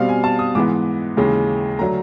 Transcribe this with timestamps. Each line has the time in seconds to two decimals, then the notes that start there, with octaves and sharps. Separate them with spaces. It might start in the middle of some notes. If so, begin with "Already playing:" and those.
Already playing: B2 G3 C4 F5
0.09 G#5
0.24 A5
0.39 D#6
0.55 G#2 E3 G#3 B3 D6
1.17 D#2 C#3 E3 G#3
1.79 D3 F#3 A3 A#5